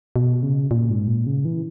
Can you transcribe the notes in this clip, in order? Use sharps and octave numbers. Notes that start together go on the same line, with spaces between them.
B2
C#3
A#2
G#2
A#2
C#3
E3